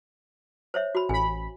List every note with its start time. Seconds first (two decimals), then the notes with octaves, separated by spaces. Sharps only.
0.74 C5 C#5 E5
0.95 F#4 B5
1.09 A1 G#5 B5